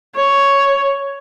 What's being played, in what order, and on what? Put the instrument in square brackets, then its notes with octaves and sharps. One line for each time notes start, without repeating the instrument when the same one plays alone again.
[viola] C#5